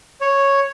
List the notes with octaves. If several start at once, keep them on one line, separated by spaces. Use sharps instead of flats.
C#5